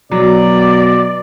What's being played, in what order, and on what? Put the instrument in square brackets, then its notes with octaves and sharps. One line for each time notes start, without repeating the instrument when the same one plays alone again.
[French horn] B2 [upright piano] F#3 [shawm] D5